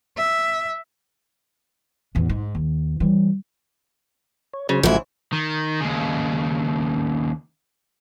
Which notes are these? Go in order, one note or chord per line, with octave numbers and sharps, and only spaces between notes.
E5
A1 E2
G#2
D#2
E3 G3
C#5
C#3 F#3 G#4 C5
A1 G#2 F3 F#3 A3 E4
D#3
D#2 C#3